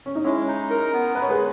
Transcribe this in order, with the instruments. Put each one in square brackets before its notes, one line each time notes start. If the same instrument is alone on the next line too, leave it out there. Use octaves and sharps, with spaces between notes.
[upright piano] C#4
D#4
[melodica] G#3 [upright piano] C#4 E4
[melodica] D#4
A#4
B3
[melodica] G#3 [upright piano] B4
[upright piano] C#5
G#4 B4